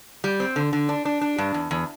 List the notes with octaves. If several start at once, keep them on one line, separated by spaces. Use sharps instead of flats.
G3
C4
D3
D3
D4
D4
D4
G2
E2
E2